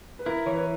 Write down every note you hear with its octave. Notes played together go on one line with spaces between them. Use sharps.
B4
E4 A#4
E3 C#5
B4